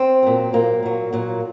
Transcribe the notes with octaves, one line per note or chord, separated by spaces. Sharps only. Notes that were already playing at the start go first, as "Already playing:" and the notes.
Already playing: C4
A#2 F#3
A#2 F#3 A#3
A#2 F#3
A#2 F#3